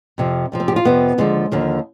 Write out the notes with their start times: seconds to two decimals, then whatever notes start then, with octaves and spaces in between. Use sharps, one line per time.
0.18 F2 C3 F3
0.52 F2 C3 F3
0.60 C4
0.68 G4
0.76 F4
0.85 F2 C3 F3 B3
1.18 D#2 D3 F3 G#3
1.52 D#2 D3 F3